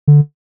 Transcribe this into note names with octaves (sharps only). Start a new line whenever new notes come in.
D3